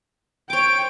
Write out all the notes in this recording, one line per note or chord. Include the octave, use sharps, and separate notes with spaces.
C5 C#5 G5 D6 D7